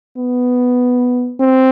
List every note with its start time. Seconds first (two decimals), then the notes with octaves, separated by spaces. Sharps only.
0.17 B3
1.41 C4